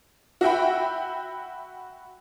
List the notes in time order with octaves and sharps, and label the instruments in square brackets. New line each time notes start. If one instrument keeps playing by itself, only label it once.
[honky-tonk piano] F#4 E5 G5 B5